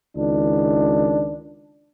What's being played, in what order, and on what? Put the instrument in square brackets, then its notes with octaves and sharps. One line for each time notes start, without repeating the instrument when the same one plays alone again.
[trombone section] C#2 D#3 D4